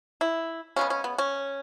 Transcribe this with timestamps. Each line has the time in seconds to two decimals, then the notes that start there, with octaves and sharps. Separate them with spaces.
0.21 E4
0.76 C#3 G#3 B3 C#4
0.90 C#4
1.04 B3
1.18 C#4